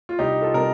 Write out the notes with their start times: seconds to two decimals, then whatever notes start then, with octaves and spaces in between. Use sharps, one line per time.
0.09 F4
0.19 C2 D#4 G4
0.42 F4 A4
0.54 C3 G3 A#4